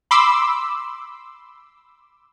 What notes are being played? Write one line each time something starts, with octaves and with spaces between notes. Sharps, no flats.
B5 C6 D6 E6